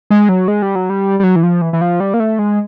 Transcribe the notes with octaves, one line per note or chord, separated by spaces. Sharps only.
G#3
F#3
G#3
G3
F#3
G3
G3
F#3
E3
F3
E3
E3
F3
G3
A#3
A3
G#3